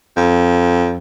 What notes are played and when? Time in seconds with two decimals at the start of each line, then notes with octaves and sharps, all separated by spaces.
0.16 F2